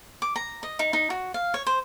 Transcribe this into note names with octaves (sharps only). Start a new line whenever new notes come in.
D6
A#5
D#5
D#4
D#4
F#4
F5
C#5
C5